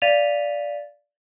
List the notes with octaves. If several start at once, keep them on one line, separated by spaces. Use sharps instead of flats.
D5 F5 A6 B6 D#7 F7